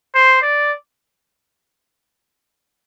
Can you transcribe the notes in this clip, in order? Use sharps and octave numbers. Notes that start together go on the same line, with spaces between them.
C5
D5